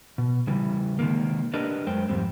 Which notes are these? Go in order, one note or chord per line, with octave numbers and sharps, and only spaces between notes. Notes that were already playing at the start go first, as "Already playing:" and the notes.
B2
C#3 E3 G3
C3 D#3 G#3 A#3
D4 G4 A#4 B4 D5 D#5
F#2 G#3 C5 G5
F2 G#2 G3 C4